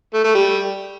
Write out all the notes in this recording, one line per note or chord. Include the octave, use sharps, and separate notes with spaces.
A3
A3
G3